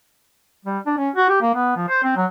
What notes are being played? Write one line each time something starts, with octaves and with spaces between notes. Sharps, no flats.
G3
D4
C#4
F#4
G4
A#3
B3
F3
C5
C4
F#3